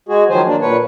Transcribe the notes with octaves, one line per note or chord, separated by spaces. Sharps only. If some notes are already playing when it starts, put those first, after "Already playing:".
G#3 F#4 G#4
D#3 F3 F#3 C5 G#5
A#3 D4
A#2 B4 C#5